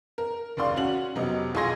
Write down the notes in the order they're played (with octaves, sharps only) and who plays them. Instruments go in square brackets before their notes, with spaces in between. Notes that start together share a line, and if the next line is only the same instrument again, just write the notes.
[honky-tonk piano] A#4
F#1 D#2 D5 F5 C6
C#4 F#4 F#7
F1 C3 F#3 B3 D#5
B1 F4 G#4 C6 G#6 A#6